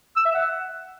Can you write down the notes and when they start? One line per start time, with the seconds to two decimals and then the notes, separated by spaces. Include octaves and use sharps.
0.17 E6
0.25 E5
0.34 F#5